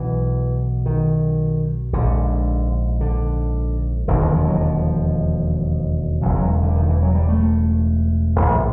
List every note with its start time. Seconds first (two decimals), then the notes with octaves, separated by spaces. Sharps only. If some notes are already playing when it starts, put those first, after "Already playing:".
Already playing: B1 B2 E3
0.86 D#3
1.93 A#1 G#2 D3
3.01 D3
4.08 E1 D#2 D3 D#3
4.21 E3
4.35 F3
4.48 F#3
4.61 F3
6.21 E1 E2 C#3 F#3
6.36 F#3
6.62 D3
6.76 D#3
6.89 E3
7.03 F#3
7.15 G3
7.29 A3
8.36 A#1 A2